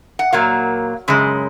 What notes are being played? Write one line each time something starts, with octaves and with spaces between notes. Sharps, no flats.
F#5
A#2 F#3 A#3 F5
F#2 C#3 G#3